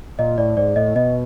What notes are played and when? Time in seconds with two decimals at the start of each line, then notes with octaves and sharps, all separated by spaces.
0.19 A#2 D#5
0.38 A2 D5
0.57 G#2 D5
0.76 A2 D#5
0.95 B2 D#5